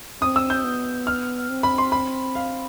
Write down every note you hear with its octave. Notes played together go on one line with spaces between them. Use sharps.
C4 D#6
E6
G6
B3
F6
C4
B5
C6
B5
F5